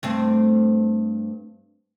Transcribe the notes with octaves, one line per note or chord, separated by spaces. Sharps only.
G2 A3 C4